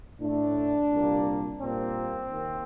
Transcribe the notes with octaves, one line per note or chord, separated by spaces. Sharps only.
A2 A3 D4
C2 A#2 G3 A#3
A#2 G3 A#3 C4
D#2 D#3 A#3